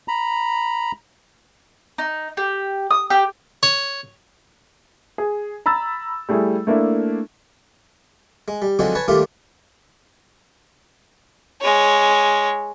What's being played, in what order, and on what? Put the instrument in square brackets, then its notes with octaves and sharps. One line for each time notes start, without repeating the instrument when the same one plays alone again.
[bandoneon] A#5 B5
[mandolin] D#4
G4
D#6
G4
[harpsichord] C#5
[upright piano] G#4
A#5 B5 E6 A6
G3 A3 E4 G#4
A3 A#3 D4 E4
[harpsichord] G#3
G3
D3 F3 F#3 G#3 C4 D#4
B4 C#5 G#5 A5
D#2 G3 A3 A#3 D4 F4
[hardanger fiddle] G#3 C#5